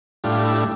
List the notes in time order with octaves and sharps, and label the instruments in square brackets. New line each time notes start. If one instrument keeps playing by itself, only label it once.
[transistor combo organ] A2 G3 D4 F4
E4